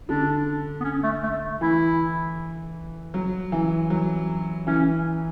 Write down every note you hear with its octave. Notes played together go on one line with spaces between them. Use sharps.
D3 D4
B3
C#4
A3
A3
E3 E4
F#3
E3
F#3
E3 C#4